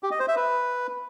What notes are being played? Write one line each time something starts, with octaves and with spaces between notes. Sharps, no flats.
G4
D#5
C5
E5
B4